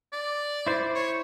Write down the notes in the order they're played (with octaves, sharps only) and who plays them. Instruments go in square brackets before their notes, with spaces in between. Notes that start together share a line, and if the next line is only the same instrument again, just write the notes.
[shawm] D5
[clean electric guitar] E4 C5
[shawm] C#5